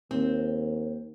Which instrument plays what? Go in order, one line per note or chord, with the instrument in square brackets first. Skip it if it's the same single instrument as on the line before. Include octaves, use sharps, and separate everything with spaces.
[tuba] D#2 [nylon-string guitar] C4